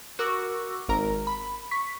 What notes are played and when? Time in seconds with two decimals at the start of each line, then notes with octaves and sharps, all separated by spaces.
0.19 F#4 A#4 C#6 D6 E6
0.88 G#1 A#4 A#5
1.27 B5
1.71 C#6 B6